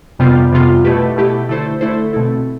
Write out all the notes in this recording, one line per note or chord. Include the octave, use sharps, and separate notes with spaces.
F2 C3 G3 B3 F4
F2 C3 G3 B3 F4
B2 A3 E4 G4 B4
B2 A3 E4 G4 B4
D3 A3 E4 A4 C5
D3 A3 E4 A4 C5
B2 A3 C4 E4 A4